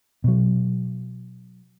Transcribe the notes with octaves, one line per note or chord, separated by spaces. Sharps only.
B2 F#3